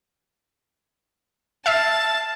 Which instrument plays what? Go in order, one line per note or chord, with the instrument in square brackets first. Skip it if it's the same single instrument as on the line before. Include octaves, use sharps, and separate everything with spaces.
[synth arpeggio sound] E5 F6 C7 [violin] A5